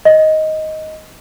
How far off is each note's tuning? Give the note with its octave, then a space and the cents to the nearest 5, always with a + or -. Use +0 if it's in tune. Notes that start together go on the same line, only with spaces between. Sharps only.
D#5 +10